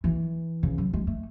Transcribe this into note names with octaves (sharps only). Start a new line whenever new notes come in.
E3
C#3
F#3
G#3
A3